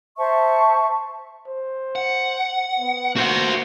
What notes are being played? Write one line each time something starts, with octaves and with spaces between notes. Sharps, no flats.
C5 E5 A5 C#6
C5
F#5
B3
A#3 F#4 C5